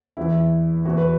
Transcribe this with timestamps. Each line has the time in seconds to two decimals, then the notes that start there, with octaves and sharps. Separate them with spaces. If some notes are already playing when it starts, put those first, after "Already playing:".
0.17 E2 E3 E4
0.85 E2 E3 F#4
0.97 B4